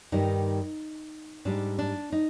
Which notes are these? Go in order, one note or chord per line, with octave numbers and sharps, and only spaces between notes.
G2 D#3 G3 D#4
G#2 G3 D4
D4
D#4